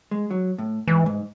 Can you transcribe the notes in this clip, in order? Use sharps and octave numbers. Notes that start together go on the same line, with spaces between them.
G#3
F#3
A2
G#2 E3
G#2